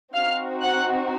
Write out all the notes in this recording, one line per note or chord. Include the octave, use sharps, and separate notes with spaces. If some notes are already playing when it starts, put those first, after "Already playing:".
C4 D#4 F#4 F5 F6
F#5 F#6